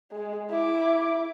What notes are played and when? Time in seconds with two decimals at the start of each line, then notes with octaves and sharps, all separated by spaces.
0.12 G#3
0.50 E4 D6